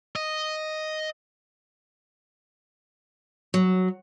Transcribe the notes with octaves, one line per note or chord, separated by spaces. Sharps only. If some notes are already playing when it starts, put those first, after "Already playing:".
D#5
F#3